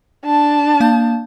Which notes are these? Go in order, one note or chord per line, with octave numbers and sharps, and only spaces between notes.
D4 A5
A#3 F5 G6